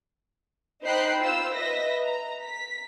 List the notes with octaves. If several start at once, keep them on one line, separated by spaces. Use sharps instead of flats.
D#4 C5 G5 B5 F#6 C7
F4 C5 E6
B4 D#5 E5 A#6 B6
A#5
B6